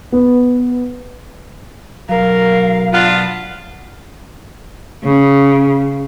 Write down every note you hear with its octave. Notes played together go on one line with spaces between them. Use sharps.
B3
B1 F#3 A#4 F5
B3 D4 F4
C#3